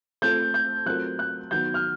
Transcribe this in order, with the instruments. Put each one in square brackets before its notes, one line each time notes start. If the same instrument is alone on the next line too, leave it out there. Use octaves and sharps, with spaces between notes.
[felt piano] A3 C4 F4 A4 C5 [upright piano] G6
[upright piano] G6
[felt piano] F#3 A3 C4 F4 A#4 [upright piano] F#6
[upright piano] F#6
[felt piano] D#3 F#3 B3 [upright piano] G6
[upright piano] F6